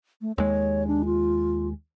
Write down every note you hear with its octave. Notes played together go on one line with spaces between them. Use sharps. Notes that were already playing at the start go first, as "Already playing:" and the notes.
A3
D#2 G#3 C#5
D4
F4